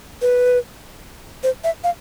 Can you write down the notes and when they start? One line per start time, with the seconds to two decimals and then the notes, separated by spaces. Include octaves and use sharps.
0.22 B4
1.43 C5
1.64 E5
1.84 F5